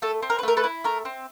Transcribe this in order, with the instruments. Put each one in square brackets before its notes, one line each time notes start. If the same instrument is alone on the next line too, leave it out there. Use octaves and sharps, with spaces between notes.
[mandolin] A3 A4
C4
A#4
B4
A3 A#4
A4 B4
E4
A3 A#4
C4